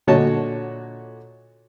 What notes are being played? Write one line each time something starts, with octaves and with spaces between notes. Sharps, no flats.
A#2 D3 F#4 C#5 D#5 A5